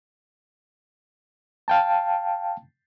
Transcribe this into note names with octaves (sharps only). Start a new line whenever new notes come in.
F5 G5 A5